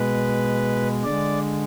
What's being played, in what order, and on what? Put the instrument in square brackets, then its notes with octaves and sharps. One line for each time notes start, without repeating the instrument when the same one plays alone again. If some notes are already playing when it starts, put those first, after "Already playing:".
Already playing: [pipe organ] B2 G#3 B4
D3 G#3 D5